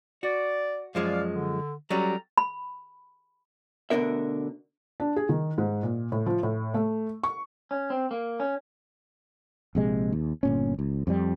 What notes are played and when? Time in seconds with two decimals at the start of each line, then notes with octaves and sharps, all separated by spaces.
0.23 F#4 D5
0.95 F#2 F3 G#3 D5 F5
1.34 D3
1.90 F#3 G3 C#4 A4 A#5
2.38 B5
3.90 D2 B2 D3 D4 A#4 E5
5.00 D4
5.16 G#4
5.29 D#3
5.58 G#2
5.83 A#2
6.12 A2
6.26 F3
6.43 A2
6.74 A3
7.24 C#6
7.71 C#4
7.90 C4
8.11 A#3
8.40 C#4
9.75 A#1 C3 G#3
10.12 D#2
10.43 G1 A#2 C#4
10.79 C#2
11.07 F2 F3 G3